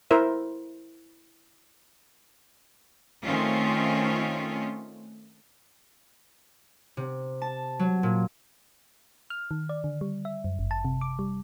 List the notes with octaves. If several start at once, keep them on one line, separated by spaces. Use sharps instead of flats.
E4 A#4 C5 E5
D#3 A3 C4 C#4 F4
C3
A5
F#3
A#2
F6
D#3
D5
D3
G3
E5
F#2
G1
A5
C3
D6
G3